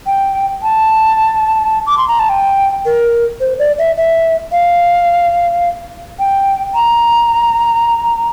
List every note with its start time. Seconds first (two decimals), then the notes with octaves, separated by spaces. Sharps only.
0.06 G5
0.63 A5
1.87 D6
1.98 C6
2.08 A#5
2.19 A5
2.29 G5
2.86 A#4
3.40 C5
3.59 D5
3.78 E5
3.97 E5
4.52 F5
6.19 G5
6.75 A#5